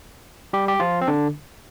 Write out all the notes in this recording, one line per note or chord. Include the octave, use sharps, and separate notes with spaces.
G3 G4
G4
F3 F4
C4
D3 D4